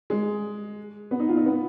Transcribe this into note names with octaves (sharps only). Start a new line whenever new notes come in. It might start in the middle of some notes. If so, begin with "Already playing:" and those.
G#3
B3
D#4
F4
D#4
B3